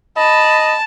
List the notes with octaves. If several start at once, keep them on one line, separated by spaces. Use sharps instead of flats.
D#5 A5 B5